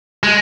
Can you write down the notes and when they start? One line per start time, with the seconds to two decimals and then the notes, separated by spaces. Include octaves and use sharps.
0.23 G#3